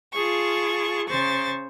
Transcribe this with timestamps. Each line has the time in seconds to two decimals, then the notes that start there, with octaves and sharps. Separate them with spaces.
0.13 F4 G#4 A5 C#6
1.08 C#3 C5 C#6 A6